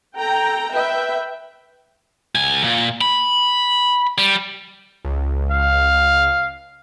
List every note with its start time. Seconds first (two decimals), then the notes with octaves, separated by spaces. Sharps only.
0.18 A4 G5 A#5
0.75 B4 E5 G5
2.35 C#2 G#5
2.64 A#2
3.01 B5
4.18 G3
5.05 C#2
5.51 F5